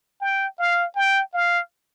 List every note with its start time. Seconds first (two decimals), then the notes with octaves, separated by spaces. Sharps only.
0.21 G5
0.59 F5
0.96 G5
1.33 F5